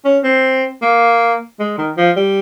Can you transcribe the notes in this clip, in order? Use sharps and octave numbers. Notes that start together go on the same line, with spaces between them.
C#4
C4
A#3
G#3
D#3
F3
G3